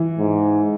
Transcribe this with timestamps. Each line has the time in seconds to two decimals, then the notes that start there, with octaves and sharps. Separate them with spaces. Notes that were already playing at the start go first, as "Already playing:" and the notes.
Already playing: E3
0.19 G#2